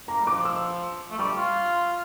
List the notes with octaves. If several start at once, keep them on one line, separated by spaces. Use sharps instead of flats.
A#3 A#5
G3
D6
F3
E6
A3
G3 C#6
F4